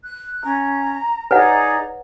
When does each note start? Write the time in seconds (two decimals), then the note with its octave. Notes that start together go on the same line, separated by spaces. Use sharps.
0.04 F#6
0.44 C#4 A#5
1.31 D#4 G#4 B4 C#5 D5 F#5 A#5